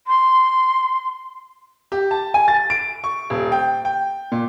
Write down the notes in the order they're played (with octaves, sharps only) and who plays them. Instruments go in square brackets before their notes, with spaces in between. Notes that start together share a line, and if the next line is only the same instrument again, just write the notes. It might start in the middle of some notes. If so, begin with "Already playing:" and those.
[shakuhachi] C6
[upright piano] G4
A5
G#5
A6
D7
C#6
D#1
G5
G5
A#2